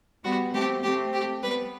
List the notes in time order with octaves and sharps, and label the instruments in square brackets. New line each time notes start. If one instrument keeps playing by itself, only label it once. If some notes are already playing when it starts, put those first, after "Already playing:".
[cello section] G3 B3 [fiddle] F#4
[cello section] A3 C4 [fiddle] G4
[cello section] A3 C4 [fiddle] G4
[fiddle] G4
[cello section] G3 B3 [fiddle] B4